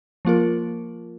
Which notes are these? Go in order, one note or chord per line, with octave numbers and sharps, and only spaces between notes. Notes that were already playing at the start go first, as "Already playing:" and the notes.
F3 A#3 F4 A#4